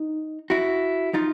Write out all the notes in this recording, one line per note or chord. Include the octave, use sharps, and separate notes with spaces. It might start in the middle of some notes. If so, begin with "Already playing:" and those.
Already playing: D#4
E4 F#4
D#4 F4